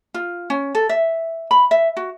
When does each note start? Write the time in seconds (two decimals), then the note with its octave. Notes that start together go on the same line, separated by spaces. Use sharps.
0.14 F4
0.50 C#4
0.75 A4
0.89 E5
1.51 B5
1.71 E5
1.97 F#4